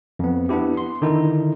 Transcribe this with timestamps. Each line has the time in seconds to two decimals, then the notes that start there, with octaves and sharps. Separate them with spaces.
0.19 F2 B3
0.49 B3 D4 E4 G4
0.77 C6
1.02 D3 D#3 D#4 E4